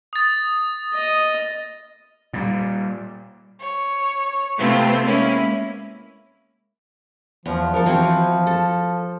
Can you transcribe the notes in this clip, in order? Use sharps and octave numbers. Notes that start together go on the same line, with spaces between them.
D#6 A6
D#5
A#2 G3
C#5
C3 A3 B3 C4 E4 F4
G#3 A#3 C#4 E4
E2 F3
F3 A4 A#4
E3 C4 F#4
A4